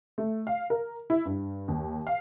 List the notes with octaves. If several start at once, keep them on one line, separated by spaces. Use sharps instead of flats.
A3
F5
A#4
E4
G2
D#2
F5